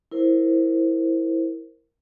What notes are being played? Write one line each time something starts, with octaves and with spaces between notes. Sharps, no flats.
E4 A#4 C5